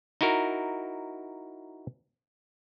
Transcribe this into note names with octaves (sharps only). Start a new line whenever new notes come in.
D#4 E4 F#4 A#4